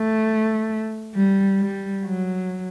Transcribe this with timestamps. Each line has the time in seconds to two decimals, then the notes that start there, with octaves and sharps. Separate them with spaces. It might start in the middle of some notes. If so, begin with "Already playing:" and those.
Already playing: A3
1.15 G3
1.59 G3
2.04 F#3